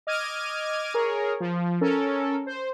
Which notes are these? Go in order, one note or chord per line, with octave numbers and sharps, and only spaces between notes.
D#5 D6 F6 G#6 D#7
G#4 A#4 C#5
F3
C#4 A4 A#4
C5